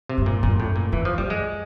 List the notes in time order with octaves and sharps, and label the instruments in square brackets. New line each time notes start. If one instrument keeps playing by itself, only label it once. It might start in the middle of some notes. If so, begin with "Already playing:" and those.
[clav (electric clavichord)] C3
[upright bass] G2
[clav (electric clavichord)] A#2
[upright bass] F#2 [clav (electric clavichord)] A#2
[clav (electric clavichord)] A2
A#2
[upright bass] F2 [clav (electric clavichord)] E3
[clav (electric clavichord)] F3
[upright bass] F#2 [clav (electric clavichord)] G3
[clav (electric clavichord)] G#3